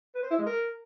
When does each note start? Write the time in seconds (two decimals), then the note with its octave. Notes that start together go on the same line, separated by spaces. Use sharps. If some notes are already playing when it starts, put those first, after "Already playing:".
0.15 B4
0.23 C5
0.31 E4
0.39 G#3
0.47 A#4